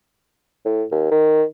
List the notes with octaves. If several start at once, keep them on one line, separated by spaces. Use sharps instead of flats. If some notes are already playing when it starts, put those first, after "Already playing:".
A2
D#2
D#3